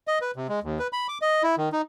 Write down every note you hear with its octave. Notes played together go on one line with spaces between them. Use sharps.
D#5
B4
C3
G#3
D#2
B4
B5
D6
D#5
E4
D#3
D#4